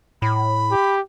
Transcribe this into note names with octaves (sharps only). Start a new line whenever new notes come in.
A2 B5
G4